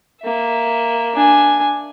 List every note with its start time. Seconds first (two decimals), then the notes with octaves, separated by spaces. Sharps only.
0.22 A#3 E5
1.14 D4 G#5